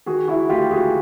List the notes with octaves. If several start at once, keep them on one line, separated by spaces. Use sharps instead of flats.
D#3 F#4 G#4
E4 F#4
D2 F4 G4
F#4 G#4